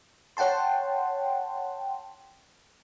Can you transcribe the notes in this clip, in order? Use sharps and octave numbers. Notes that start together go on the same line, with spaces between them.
C#5 F#5 G5 A5 C6